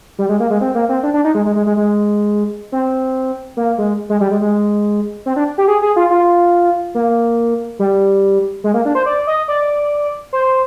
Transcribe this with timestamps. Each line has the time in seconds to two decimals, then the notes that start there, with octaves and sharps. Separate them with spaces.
0.18 G3
0.29 G#3
0.40 A#3
0.50 G#3
0.61 C4
0.75 A#3
0.89 C4
1.03 D4
1.14 D4
1.24 D#4
1.35 G#3
1.46 G#3
1.56 G#3
1.66 G#3
1.77 G#3
2.72 C4
3.57 A#3
3.78 G#3
4.09 G#3
4.20 G3
4.31 G#3
4.41 G#3
5.26 C4
5.36 D4
5.58 G4
5.68 G#4
5.82 G#4
5.96 F4
6.10 F4
6.95 A#3
7.79 G3
8.64 G#3
8.74 A#3
8.85 D4
8.95 C5
9.06 D5
9.27 D#5
9.48 D5
10.33 C5